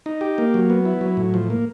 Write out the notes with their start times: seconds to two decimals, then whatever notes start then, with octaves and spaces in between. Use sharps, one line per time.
0.06 D#4
0.21 G4
0.38 A#3
0.54 F#3
0.70 B3
0.85 E4
1.01 F#3
1.17 A2
1.34 F3
1.50 A#3